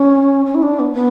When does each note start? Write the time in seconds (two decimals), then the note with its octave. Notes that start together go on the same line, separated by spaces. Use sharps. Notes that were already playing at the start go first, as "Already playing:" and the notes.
Already playing: C#4
0.46 C#4
0.55 E4
0.62 D4
0.79 B3
0.93 B3